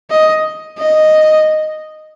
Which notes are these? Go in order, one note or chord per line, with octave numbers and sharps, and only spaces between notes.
D#5
D#5